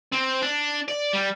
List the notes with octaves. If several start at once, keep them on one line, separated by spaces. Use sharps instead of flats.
C4
D4
D5
G3